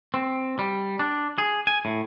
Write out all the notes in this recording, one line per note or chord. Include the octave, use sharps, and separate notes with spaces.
C4
G3
D4
G#4
G#5
A2